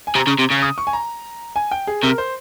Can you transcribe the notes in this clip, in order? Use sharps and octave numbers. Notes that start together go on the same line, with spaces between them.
G#5
C3 A#5
C#3
C3
C#3
D#6
C#6
G#5
A#5
G#5
G5
G#4
C3 A#4
C5